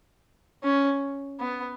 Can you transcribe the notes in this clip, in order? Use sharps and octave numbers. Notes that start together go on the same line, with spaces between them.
C#4
B3